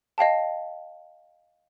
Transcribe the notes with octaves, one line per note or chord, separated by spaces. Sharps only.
D#5 F5 G5 A5